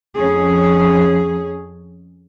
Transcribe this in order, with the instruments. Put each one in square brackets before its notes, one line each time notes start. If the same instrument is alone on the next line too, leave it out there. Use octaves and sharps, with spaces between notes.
[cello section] F2 C#4 G#4